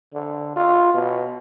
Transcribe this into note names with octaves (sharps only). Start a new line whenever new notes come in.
D3
F4
B2